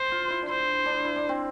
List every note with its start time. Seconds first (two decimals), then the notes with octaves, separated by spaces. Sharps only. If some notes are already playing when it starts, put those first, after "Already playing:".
Already playing: C5
0.11 F4
0.30 E4
0.42 D4
0.49 E4 C5
0.86 D4
1.05 E4
1.16 D4
1.29 C4